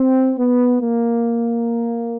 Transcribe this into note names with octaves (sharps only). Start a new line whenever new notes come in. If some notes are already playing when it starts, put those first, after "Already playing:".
Already playing: C4
B3
A#3